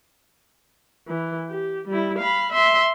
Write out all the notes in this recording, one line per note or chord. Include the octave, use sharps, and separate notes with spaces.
E3
G4
G3 E4
F5 B5
E5 C6